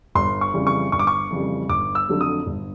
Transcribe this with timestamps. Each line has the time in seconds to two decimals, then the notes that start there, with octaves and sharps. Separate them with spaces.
0.15 G1 C6
0.41 C#6
0.54 F2 C#3 E3 G3
0.67 C#6
0.92 G1 C#6
0.99 D6
1.07 C#6
1.30 F2 C#3 E3 G3
1.69 G1 D6
1.95 E6
2.08 F2 D3 F#3 A3
2.21 D#6
2.46 G1